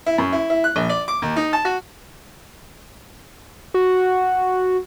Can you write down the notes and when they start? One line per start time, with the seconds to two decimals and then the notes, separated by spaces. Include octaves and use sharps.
0.06 E4
0.18 F#2
0.33 E4
0.50 E4
0.64 F#6
0.76 A#1
0.89 D5
1.08 D6
1.22 D#2
1.36 D#4
1.53 A5
1.65 F#4
3.74 F#4